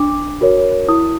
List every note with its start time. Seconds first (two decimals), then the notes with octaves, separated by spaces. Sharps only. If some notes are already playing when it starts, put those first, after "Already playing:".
Already playing: D4 D6
0.41 F#4 A#4 C#5
0.88 E4 D#6